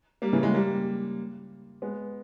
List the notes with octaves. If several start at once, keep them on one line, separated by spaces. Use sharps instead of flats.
G3 A#3
C#3 E3
E3 G#3
G3 A#3
G#3 B3